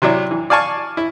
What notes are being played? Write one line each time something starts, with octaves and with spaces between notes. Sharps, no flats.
C3 F#3 D4 E4
E3
D5 F5 G#5 A5 C#6
E4